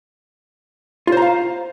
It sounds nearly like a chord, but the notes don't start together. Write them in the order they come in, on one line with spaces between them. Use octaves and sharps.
F4 C5 A#5 F5